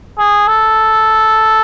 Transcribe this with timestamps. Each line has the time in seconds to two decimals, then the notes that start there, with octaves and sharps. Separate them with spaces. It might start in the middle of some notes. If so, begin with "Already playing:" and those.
0.18 G#4
0.47 A4